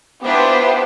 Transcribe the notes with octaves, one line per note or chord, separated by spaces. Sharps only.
B3 D4 E4 F4 G4 C5